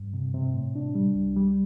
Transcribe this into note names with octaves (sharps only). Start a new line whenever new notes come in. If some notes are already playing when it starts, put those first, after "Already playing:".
Already playing: G2
C3
C3
A2
D4
G3
C2
G3